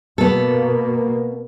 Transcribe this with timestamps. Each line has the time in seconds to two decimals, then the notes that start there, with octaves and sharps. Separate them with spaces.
0.18 B2 A#3 B3 A4